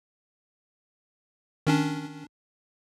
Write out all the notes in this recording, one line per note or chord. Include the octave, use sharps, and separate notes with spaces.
D#3 C#4 D4